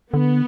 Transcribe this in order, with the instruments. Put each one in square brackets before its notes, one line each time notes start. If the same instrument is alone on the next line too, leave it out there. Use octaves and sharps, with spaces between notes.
[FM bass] D3 [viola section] B3